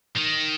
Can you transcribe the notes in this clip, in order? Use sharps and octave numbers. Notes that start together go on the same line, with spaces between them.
D#3